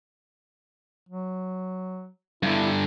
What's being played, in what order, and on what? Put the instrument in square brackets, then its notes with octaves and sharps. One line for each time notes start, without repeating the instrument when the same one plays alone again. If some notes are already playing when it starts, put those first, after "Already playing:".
[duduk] F#3
[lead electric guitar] G2 D3 [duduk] E4